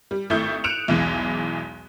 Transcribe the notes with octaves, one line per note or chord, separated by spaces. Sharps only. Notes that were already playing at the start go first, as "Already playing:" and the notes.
G3
G#1 A3 E4 C#6 D#6 G6
F#6 C#7 D7 E7 F7
B1 E2 E3 G#3